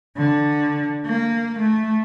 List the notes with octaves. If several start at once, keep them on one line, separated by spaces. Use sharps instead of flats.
D3
A#3
A3